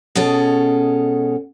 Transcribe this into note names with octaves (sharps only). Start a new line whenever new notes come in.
B2 G#3 C#4 A4